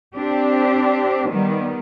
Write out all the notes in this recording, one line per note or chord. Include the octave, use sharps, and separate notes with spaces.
C4 D4 G4
D#3 G3 B3